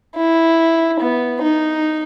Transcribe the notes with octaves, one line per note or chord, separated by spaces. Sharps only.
E4
B3
D#4